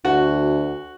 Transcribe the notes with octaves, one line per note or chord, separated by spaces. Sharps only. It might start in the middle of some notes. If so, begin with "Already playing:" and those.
D2 F#4